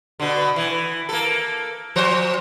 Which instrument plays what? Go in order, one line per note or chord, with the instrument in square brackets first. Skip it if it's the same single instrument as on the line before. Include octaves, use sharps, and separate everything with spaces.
[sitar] B2 D3
E3
A#3 A4
F3 C5